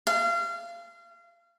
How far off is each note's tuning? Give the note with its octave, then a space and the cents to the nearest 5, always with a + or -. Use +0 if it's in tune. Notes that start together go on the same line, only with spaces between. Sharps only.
F5 -30